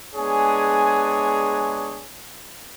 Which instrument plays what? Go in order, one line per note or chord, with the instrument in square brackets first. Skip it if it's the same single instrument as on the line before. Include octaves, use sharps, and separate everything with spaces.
[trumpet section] G#3 B3 D4 G#4 C#5 G#5